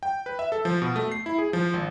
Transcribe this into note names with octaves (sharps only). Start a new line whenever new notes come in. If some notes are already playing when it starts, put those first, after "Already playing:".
G5
B4
E5
A4
F3
B2
A3
C7
E4
G#4
F3
G#1